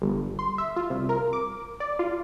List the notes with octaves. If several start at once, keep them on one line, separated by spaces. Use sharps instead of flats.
G1
C6
E5
F4
C2
A#4
D6
D5
F4